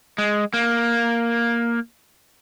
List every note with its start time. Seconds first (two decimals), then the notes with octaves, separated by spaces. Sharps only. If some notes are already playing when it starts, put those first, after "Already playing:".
0.18 G#3
0.54 A#3